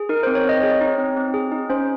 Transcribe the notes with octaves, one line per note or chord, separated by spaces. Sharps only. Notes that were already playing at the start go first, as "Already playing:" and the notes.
Already playing: G#4
D#4 A#4
C5
C4
C#5
C4 D#5
G#4 C#5
D#4
C4
C4
G#4
D#4
C#4 C5